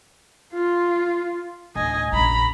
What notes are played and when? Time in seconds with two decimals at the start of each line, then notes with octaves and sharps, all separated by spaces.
0.53 F4
1.75 D1 D#5 G#5
2.12 A#1 F#2 A#5 B5